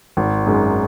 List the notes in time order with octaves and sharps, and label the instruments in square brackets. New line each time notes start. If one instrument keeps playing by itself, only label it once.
[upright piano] G#1
F#2 D#3 G#3 D#4